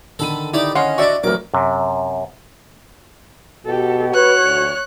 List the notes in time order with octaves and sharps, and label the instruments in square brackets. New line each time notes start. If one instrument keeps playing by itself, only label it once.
[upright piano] D3 D#3 D#7 [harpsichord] A4 B5
[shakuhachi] D#4 [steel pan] E4 [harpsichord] G4 D5
[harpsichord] C#4 [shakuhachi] D#5 [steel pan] F5 F#5 C6
[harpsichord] D4 F#4 [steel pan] D5 E5 C#6
[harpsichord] A1 D6 [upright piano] F#3 [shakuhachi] A#4
[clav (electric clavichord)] F#2 C3
[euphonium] B2 [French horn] F#4 [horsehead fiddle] G4 A4
[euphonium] B4 [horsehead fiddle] C#5 [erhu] F#6
[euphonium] D2